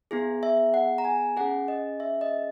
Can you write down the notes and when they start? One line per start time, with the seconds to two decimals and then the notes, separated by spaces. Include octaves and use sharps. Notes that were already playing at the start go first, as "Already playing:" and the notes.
0.11 B3 E4 G#4
0.43 E5
0.74 F#5
0.98 A#5
1.05 G#5
1.37 C#4 G#4 F#5
1.68 D#5
2.00 E5
2.21 D#5